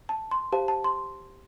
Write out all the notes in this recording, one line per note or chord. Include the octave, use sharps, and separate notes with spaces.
A5
C6
G4 C5 F5 A5
A5
C6